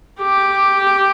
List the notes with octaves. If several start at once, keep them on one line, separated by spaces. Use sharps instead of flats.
G4